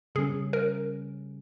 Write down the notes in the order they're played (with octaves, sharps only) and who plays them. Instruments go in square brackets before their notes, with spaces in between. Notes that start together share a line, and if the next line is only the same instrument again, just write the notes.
[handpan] C#3 G3 C#4 [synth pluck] G#4
[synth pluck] A#4